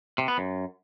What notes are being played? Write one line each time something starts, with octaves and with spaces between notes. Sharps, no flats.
C3
B3
F#2